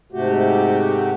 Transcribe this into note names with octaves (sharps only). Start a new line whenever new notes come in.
G#2 C3 A3 F#4 G4